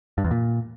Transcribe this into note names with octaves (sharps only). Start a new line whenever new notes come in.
G2
E2
A#2